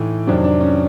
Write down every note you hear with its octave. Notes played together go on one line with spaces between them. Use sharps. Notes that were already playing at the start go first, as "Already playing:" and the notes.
Already playing: A2 E3 D#4
F2 C3 D#3 F#3 D4
D4
C#4